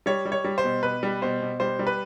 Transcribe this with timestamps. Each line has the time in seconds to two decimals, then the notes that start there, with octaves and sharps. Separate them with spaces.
0.06 G3 C#5
0.25 G3
0.32 C#5
0.44 G3
0.58 C5
0.64 B2
0.83 B2 B4
1.03 G3
1.22 B2 C5
1.42 B2
1.60 G3 C5
1.79 G3
1.87 B4